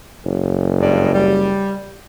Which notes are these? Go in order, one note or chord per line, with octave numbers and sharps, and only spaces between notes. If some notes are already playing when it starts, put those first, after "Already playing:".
F#1
G2 G#3 D5
G3